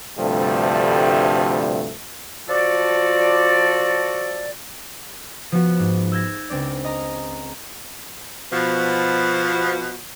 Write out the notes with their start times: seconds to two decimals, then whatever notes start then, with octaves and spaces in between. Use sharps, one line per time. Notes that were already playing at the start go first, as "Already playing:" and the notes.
0.19 D2 G2 C3 F3 G3 A3
2.48 F3 F4 F#4 A4 D5
5.52 F3 B3 F#4
5.79 G#2
6.12 E6 G6 G#6 A#6
6.50 C#2 C4 D4 D5
6.84 D#5 A#5
8.51 B2 F3